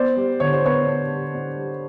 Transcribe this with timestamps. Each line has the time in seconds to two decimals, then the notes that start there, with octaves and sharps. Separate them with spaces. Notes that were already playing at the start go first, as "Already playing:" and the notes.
Already playing: B3 C5 D5
0.17 G3
0.40 D3 C#5
0.53 C5
0.64 B3 B4 C#5
0.87 D4
1.10 G3
1.34 D4
1.58 G3